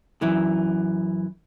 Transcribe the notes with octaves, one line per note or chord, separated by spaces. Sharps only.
F#2 E3